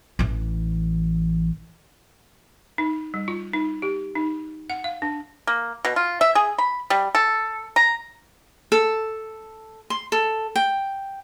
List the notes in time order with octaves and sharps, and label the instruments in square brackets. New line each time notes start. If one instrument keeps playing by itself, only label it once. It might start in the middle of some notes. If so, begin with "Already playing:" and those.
[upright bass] A1 E3
[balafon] D#4
G3
F4
D#4
G4
D#4
F#5
F5
D4
[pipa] A#3
B2
F4
E5
G#4
B5
G3
A4
A#5
[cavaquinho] A4
C6
A4
G5